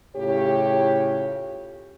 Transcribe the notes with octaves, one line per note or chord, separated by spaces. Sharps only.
A2 C#3 F4 G4 C#5